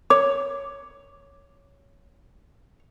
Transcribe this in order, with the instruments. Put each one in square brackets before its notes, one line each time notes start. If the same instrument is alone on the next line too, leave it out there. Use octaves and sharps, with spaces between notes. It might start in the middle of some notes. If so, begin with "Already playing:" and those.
[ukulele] C#5 [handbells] D6